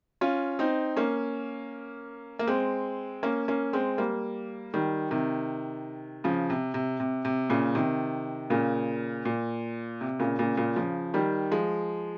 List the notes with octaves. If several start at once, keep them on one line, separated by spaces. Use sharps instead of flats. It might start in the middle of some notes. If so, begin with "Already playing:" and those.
C#4 F4
C4 D#4
A#3 C#4
A#3
G#3 C4
A#3 C#4
A#3 C#4
G#3 C4
G3 A#3
D#3 G3
C3 D#3
C#3 F3
C3
C3
C3
C3
A#2 C#3
C3 D#3
A#2 C#3
A#2
C3
A#2 C#3
A#2 C#3
A#2 C#3
C#3 F3
D#3 G3
F3 G#3